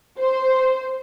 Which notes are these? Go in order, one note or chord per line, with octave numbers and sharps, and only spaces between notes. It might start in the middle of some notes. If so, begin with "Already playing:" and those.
C5